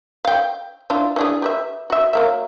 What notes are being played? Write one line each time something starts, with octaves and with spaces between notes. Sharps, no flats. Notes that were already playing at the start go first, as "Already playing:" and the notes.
F5 G5
D4 E4 F4
E3 D4 G#4
G4 B4 E5
F#4 E5
F#3 A#3 E5